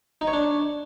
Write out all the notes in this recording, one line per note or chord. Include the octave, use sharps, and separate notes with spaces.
D#4
C#5
D4